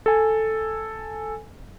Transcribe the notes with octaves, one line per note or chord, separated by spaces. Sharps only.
A4 G#5